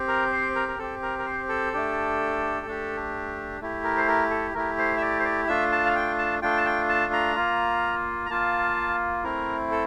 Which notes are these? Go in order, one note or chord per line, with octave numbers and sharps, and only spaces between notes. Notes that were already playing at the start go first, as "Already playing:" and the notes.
Already playing: C4 G4
A#4
C5
A#4
A#4
C4 G4 A4
A#4
A#4
C5
A4
A3 D4 G4
A3 D4 G4
A3 E4 G4
A#4
C5
A#4
A4
A3 E4 G4 A#4
C5
E5
D5
C5
D5
A3 D4 F4 E5
A5
F5
G5
A5
A3 D4 F4 G5
A5
G5
A5
A#5
A#3 F4
A#5
A#3 F4 A5
A3 C4 E4 A#4
A4